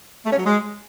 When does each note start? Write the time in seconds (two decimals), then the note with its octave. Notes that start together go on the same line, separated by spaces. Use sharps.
0.25 A3
0.31 C#4
0.38 F#3
0.44 G#3